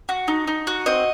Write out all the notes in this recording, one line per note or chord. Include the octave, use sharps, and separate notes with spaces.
F#4
D#4
D#4
F#4
C4 D#5